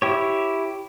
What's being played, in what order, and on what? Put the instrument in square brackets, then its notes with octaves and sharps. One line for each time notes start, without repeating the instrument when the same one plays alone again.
[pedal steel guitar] E4 G4 C#5